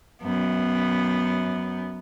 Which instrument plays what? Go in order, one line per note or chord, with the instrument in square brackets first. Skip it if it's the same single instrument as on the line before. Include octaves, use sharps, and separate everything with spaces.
[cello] F#2 B3